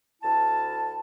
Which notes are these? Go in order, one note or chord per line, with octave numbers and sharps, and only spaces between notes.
D2 E4 A5